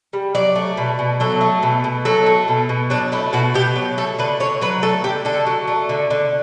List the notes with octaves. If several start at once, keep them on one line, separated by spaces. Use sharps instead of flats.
G3
F#3 D5
A3
B2
B2
F#3 A4
A3
B2
B2
F#3 A4
A3
B2
B2
F#3 D4
A3 E4
B2 F#4
B2 G4
F#3
A3 A4
D3 B4
D3 C#5
F#3 B4
A3 A4
D3 G4
D3 A4
F#3
A3
D3
D3